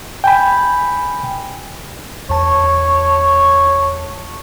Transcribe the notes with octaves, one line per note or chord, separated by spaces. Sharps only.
G5 G#5 B5
E2 C#5 A5